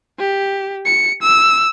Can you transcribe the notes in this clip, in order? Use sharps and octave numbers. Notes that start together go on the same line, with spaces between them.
G4
C#7
E6